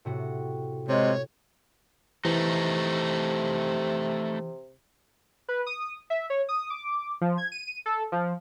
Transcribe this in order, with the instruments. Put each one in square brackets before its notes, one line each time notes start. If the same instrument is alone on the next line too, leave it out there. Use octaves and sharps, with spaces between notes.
[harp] A2 C3 F#4
[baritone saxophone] C3 [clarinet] G#3 [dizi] C#5
[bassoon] C3 [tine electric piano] E3 [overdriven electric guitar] A3 D#4
[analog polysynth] B4
D#6
E5
C#5
D#6
D6
F3
G#6
D#7
A4
F3